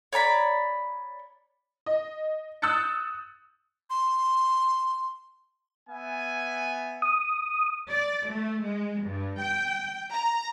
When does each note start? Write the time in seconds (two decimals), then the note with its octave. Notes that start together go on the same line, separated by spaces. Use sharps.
0.13 C#5 D5 A#5 B5
1.86 D#5
2.62 D#6 E6 F#6 G6 A6 C#7
3.90 C6
5.89 B3 E5 G#5
7.02 D#6
7.89 D5
8.29 A3
8.64 G#3
9.02 G2
9.40 G5
10.13 A#5